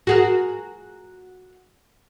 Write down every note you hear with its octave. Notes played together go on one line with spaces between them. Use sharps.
F#4 G#4 A#4